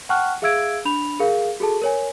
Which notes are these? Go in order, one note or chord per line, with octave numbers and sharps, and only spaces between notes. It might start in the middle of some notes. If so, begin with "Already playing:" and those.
F#5 G5 A5 C#6 F6 F#6
G#4 E5 F5 E6 G#6 D7
D4 B5 F7
G#4 A#4 F5
F#4 G#4 A4 A5
A#4 C#5 G#5